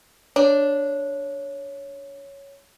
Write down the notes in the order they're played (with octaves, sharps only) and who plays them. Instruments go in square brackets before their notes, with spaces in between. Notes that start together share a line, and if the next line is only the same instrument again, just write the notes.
[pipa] D4 [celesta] C#5